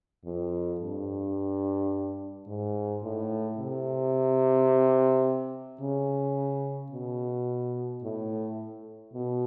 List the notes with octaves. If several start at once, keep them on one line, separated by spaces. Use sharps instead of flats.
F2
G2
G#2
A2
C3
C#3
B2
A2
B2